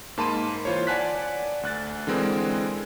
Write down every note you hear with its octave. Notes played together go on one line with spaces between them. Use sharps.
G#2 A#3 A5 B5 C6 D#7
E3 F4 C5 C#5
D5 F#5 G#5 A5 F#6 B6
D2 F#6 A6
D3 E3 G#3 C4 A#4